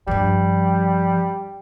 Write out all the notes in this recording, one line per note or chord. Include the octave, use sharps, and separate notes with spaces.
G2 F3 G3